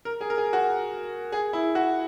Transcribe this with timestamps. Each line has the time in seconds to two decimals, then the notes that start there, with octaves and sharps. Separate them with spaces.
0.05 A#4
0.21 G#4
0.30 A#4
0.38 G#4
0.53 F#4
1.32 G#4
1.53 E4
1.75 F#4